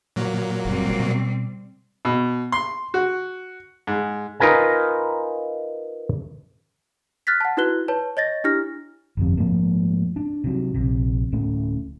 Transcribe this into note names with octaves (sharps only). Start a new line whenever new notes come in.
A#2 F#3 A#3
F#1 G3 C4
B2
B2
C6
F#4
G#2
D#4 F4 A#4 B4 G#5 A#5
F6 F#6 A6 B6
F#5 A5
D#4 E4 F#4 B4 F#6 G7
B4 C#5 A5
C#5 D#5 A6 A#6
D4 E4 G4 F6 A#6
G1 F2 C3
G#2 F3 A3 A#3
D4
C3 F#3
A#1 C3
D1 A2 A3 C#4